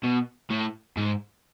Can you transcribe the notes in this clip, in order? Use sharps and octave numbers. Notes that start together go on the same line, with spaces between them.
B2
A2
G#2